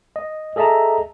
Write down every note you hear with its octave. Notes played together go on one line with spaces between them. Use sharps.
D#5
G#4 A4 D#5 E5 A5 A#5